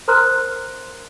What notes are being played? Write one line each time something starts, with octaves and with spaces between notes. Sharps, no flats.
A#4 C5 A#5 C6 F6 F#6